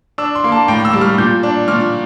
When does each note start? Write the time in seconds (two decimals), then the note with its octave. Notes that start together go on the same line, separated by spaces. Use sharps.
0.18 D4 E6
0.35 C6
0.44 A#3
0.52 A5
0.68 A2 G5
0.85 E6
0.93 G3
1.01 F6
1.18 A#2 G6
1.43 D4
1.68 A#2 F6